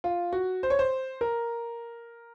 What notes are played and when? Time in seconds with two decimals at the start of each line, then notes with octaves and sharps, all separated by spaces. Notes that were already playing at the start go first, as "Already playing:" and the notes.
0.04 F4
0.33 F#4
0.63 C5
0.70 C#5
0.79 C5
1.21 A#4